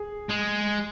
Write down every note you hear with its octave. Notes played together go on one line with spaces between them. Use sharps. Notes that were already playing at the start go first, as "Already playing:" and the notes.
Already playing: G#4
G#3